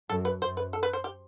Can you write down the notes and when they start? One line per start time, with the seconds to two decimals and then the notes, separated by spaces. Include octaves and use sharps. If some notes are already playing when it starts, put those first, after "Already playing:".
0.10 F#2 A4
0.25 B4
0.41 F#2 C5
0.57 B4
0.73 A4
0.83 B4
0.93 C5
1.04 G4